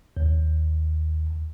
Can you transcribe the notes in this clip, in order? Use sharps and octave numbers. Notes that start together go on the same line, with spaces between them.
D#2